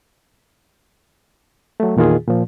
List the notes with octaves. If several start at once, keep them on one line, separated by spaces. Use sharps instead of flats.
F#3 A3
E2 A#2 D#3 F4 G#4
A#2 F3